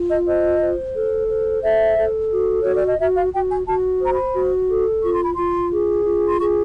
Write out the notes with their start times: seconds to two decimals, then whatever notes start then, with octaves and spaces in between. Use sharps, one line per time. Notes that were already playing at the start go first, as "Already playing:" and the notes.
Already playing: F4
0.10 D#5
0.27 C5 D#5
0.61 C5
0.95 A4
1.29 C5
1.63 A4 E5
1.98 A4
2.31 F#4
2.62 F#4 C#5
2.75 D5
2.87 D#5
2.99 F#4 E5
3.16 F5
3.33 F#4 G5
3.50 G#5
3.67 F#4 A5
4.01 C5 A#5
4.12 B5
4.35 F#4
4.69 A4
5.03 F4 C#6
5.14 C6
5.23 B5
5.34 F4 C6
5.71 G#4
6.05 F4
6.28 C6
6.40 G#4 C#6